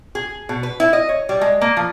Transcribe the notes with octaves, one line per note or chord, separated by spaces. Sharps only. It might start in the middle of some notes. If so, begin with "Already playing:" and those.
G#4
B2
B4
E4
D#5
C#5
G3
G#3
A#3
F3